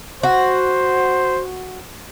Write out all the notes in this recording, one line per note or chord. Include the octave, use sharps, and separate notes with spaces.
F#4 C5